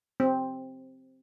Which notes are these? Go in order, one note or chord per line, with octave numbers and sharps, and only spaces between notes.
C4